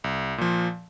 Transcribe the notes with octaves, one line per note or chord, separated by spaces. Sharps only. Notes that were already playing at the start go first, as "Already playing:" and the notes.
C2
A#2 F3